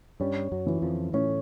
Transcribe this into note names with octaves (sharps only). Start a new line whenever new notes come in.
G2 G3 C#4
F#2 F#3
E3
F2 F3
A2 A3 C#4